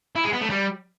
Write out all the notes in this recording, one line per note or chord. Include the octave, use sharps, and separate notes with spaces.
E4
G#3
B3
A3
G3